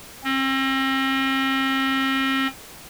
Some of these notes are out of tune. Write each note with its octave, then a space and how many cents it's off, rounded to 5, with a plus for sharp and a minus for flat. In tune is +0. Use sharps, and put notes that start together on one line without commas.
C4 +40